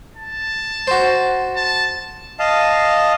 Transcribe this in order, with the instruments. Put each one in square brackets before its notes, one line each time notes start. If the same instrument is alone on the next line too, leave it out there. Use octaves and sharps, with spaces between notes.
[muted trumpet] A5
[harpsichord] F#4 C5
[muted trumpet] A5
[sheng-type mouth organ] D#5 F5 A5